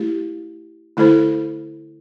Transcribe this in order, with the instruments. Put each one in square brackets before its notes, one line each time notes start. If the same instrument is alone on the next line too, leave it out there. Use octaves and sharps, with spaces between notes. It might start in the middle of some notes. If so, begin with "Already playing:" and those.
Already playing: [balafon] A3 E4 G4
D3 A3 E4 A4 C5